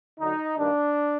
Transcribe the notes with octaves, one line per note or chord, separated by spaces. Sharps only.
D2 D3 F#3 D#4
G2 D#3 G3 A#3 D4